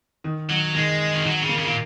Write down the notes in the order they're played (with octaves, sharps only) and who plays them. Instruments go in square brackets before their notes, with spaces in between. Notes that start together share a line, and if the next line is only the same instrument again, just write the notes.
[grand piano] D#3
[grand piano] D#3 [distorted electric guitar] F#3
[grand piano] D#3 [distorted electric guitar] G#3
[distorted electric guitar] D#3
[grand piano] D#3 [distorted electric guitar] F#3
[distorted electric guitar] C#3
[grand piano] A#3
[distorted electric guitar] C#3
A#2